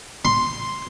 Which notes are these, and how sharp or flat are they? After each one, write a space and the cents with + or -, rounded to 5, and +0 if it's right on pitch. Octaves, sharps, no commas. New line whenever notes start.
C6 +0